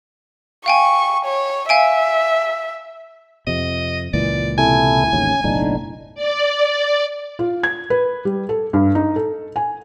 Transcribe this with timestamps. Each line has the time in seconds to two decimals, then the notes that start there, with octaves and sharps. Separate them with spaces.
0.66 F5 G5 G#5 C#6
1.25 C#5
1.69 E5 F5 G#5 D7
3.47 F2 C3 D#5
4.14 C#2 A#2 E3 D5
4.58 C3 E4 A4 G#5
5.13 A1 D#2 G#2 C#4
5.44 F#1 B1 A2 D4 D#4
6.15 D5
7.39 F4
7.63 G#6
7.90 B4
8.25 G3
8.49 A4
8.73 G2
8.95 D#4
9.16 A4
9.56 G#5